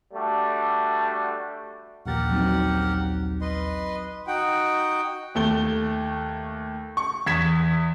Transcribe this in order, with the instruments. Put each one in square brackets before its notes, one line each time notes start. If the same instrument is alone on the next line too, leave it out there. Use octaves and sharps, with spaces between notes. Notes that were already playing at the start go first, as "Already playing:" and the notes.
[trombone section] G3 A3 D4 F#4
[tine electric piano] A#1 D#2 A6 [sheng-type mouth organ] G4 A#4 F#5
[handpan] F#3 C4 D#4
[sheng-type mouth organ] B4 D#5 C6
D#4 F#4 F#5 G5
[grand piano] D#2 A3 G7
C#6
E2 G#6 B6 E7